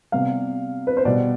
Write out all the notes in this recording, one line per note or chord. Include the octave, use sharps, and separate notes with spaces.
C3 G3 B3 F5
B4
C5
B2 G3 B3 D5